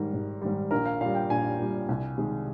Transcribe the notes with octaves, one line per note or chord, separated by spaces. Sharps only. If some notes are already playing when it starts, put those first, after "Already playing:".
Already playing: G#2 D#3 G3 A#4
G#1
G#2 D#3 G3
A#1 A#4
F5
A#2 G3 F5
G5
A#1 G#5
A#2 G3
C2
C3 D#3 G#3